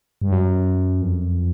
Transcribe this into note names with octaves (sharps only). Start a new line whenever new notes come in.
G2
F#2
F2